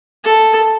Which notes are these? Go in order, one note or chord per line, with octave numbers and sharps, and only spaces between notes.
A4